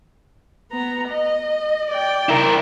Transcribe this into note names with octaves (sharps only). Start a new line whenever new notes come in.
B3 A#5
D#5
D5 G5
E4 A#4